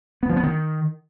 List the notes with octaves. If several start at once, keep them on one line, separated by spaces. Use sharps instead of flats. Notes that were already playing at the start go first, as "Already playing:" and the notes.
B3
F3
B3
D#3